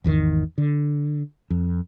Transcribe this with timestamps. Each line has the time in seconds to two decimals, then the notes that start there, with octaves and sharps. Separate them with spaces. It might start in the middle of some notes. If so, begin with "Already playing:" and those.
0.04 G#1 E2 C3 D#3
0.58 D3
1.50 F2